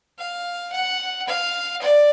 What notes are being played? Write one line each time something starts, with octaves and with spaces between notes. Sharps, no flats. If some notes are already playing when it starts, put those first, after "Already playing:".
F5
F#5
F5
D5